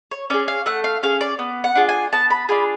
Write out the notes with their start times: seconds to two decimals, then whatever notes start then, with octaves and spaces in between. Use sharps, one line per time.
0.11 C#5
0.30 C#4 G#4 D5
0.48 F5
0.66 A3 F#5
0.84 F5
1.03 C#4 G#4 F5
1.21 D5
1.39 B3
1.64 F#5
1.76 D4 F4 G#4
1.89 G#5
2.13 B3 A5
2.30 B5
2.49 D4 F4 G#4 B5